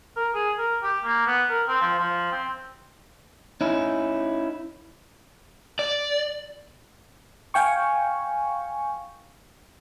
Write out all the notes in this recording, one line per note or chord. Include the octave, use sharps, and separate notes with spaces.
A#4
G#4
A#4
G4
A#3
B3
A#4
C4
F3
F3
C4
C#4 D#4 E4
D5
F5 G5 G#5 C#6